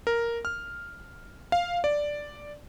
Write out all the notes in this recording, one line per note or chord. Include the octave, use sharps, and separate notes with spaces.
A#4
F6
F5
D5